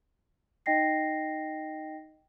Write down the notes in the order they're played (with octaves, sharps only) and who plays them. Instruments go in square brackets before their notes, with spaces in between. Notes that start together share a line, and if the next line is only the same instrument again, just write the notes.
[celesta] D#4 D#5 G5 A#6 C7